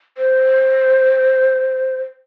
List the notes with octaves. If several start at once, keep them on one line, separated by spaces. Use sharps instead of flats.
C5